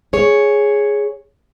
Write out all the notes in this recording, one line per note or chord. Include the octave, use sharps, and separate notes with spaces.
G#4 C#5